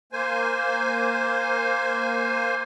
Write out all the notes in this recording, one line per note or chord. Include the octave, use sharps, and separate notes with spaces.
A#3 C5 G#5